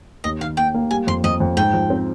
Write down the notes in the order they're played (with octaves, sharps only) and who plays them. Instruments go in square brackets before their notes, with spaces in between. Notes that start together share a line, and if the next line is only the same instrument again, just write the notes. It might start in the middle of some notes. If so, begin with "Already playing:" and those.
[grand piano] D#2 [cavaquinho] D#5
[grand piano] D#3 [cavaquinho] F5
[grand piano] A#3 [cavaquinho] G5
[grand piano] A#3
[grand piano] G3 [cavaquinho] G#5
[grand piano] F2 [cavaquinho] C6
[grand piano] F2 [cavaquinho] D#5
[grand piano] F2
[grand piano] G#2 [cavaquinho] G5
[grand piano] F3
C4